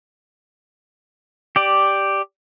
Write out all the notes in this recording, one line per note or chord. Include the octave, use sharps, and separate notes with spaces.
G4 D5